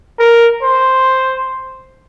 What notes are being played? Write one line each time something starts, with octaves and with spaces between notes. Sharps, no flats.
A#4
C5